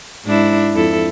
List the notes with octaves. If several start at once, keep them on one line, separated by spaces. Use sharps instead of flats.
G#2 D4 E4
F2 E4 A4